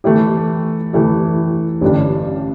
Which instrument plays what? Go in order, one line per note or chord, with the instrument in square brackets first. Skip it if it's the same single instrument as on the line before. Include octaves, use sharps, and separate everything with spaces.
[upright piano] E3 A3 E4 G4
E3 A3 E4 G4
A1 G2 D3 G3 D4